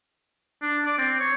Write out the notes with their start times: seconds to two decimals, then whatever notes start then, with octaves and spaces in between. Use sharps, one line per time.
0.62 D4
0.85 D5
0.98 C4
1.20 C#5